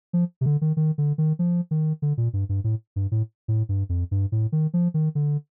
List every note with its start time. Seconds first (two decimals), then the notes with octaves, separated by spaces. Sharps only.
0.13 F3
0.41 C3
0.46 D3
0.61 D#3
0.77 D#3
0.98 D3
1.18 D#3
1.39 F3
1.71 D#3
2.02 D3
2.18 A#2
2.33 G2
2.49 G2
2.64 A2
2.96 G2
3.12 A2
3.48 A2
3.69 G2
3.89 F2
4.11 G2
4.32 A2
4.52 D#3
4.74 F3
4.94 D#3
5.15 D3